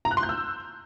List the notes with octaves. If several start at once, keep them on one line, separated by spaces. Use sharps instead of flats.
A#5
F#6
C6
G6
E6